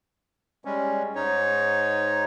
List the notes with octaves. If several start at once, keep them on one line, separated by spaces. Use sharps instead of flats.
G3 G#3 C#4
G#2 D#4 C#5